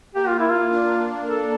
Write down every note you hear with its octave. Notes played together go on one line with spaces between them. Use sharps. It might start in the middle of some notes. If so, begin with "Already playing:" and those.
A#3 G4
F4
E4
F4
D4
A4